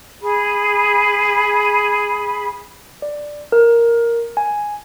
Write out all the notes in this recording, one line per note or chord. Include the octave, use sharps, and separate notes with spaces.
G#4 B5
D5
A#4
G#5